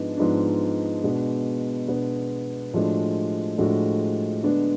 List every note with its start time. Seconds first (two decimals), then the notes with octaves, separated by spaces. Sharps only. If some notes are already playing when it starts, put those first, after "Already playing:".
Already playing: G#2 F3 G#3 B3 D4
0.17 G#2 F3 G#3 B3 D4
1.03 B2 G#3 B3 D4
1.88 B2 G#3 B3 D4
2.73 A2 F3 G#3 D4 F#4
3.58 A2 F3 G#3 D4 F#4
4.44 D3 G#3 B3 D4